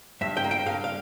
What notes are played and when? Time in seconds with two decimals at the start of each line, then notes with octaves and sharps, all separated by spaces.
0.21 G2 E5
0.37 G5
0.44 A#3
0.51 G5
0.66 G2 F5
0.84 F5